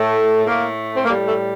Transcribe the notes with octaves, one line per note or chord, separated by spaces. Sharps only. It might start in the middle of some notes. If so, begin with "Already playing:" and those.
Already playing: A2 A3
A2 A3 A#3
C4
A2 G3 A#3
A3